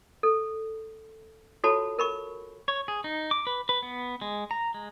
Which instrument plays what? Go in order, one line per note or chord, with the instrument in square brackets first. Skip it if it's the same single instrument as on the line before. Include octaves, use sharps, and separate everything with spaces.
[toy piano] A4
F4 F#4 A4 C#5 A5 B5
A#4 B5 C#6
[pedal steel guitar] C#5
G#4
D#4
D6
B4
B4
B3
G#3
A#5
G#3